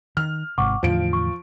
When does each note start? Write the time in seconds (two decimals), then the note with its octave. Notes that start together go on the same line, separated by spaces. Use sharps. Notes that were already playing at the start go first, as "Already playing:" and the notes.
0.17 D#3 F6
0.58 G#1 G#2 C3 F#5 C#6 D6
0.83 E2 A2 D3 F3 C5 F5 D7
1.13 C#6